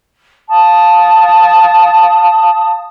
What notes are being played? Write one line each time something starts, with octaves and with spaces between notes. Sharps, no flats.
F5 A5 D#6